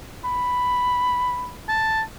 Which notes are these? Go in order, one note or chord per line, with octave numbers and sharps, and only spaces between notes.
B5
A5